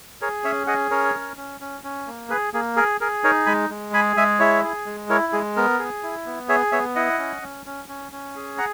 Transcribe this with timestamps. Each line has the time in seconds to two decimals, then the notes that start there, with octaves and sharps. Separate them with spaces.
0.21 G#4 A#4 C#5
0.44 C#4 C#5 E5
0.67 G#4 D#5 F#5
0.91 C#4 A#4 C#5
1.14 C#4
1.37 C#4
1.61 C#4
1.84 C#4
2.07 A#3
2.30 G#4 B4
2.54 A#3 G#4
2.76 G#4 A#4
3.01 G#4 A#4
3.24 D#4 A#4 C#5
3.46 G#3 G#5 B5
3.70 G#3
3.93 G#4 G#5 B5
4.17 G#3 E5 G#5
4.39 E4 C#5 E5
4.63 G#4
4.86 G#3
5.09 E4 A#4 C#5
5.33 G#3 G#4
5.56 B3 A#4
5.79 G#4
6.03 E4
6.26 B3
6.49 G#4 C#5 E5
6.72 B3 C#5 E5
6.95 E4 D#5 F#5
7.19 C#4
7.42 C#4
7.66 C#4
7.89 C#4
8.12 C#4
8.36 G#4
8.58 F#5 A#5